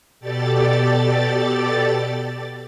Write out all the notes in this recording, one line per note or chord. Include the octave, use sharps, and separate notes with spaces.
B2 G4 A4 D5 A6